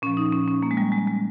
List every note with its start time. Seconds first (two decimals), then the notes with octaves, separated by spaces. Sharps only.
0.02 A#2 F3 C#4
0.17 D#4
0.32 C#4
0.48 C#4
0.63 A#3
0.71 G#3
0.77 G3
0.92 G#3
1.08 G#3